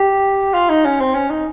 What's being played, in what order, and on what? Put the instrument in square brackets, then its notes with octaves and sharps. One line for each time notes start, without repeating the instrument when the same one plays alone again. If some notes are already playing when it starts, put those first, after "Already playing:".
Already playing: [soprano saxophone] G4
F4
D#4
C#4
C4
C#4
D#4